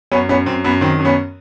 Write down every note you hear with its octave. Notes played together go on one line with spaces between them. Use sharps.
F#2 B3 C#4
F#2 B3 C#4
F#2 C4
F#2 B3
D#3 C4
F#2
B3 C#4